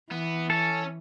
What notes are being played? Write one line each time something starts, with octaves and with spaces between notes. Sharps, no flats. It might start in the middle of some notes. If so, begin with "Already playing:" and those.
E3 B3
C#4 A4